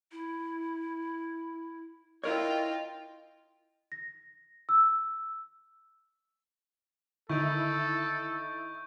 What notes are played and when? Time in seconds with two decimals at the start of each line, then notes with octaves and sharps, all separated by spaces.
0.12 E4
2.24 E4 F4 A#4 C#5 D#5 G5
3.92 A#6
4.69 E6
7.29 D3 D#3 D#4 E4 A4 C#6 G6 D7